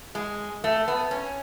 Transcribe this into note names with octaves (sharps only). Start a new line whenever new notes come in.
G#3
A3
B3
C#4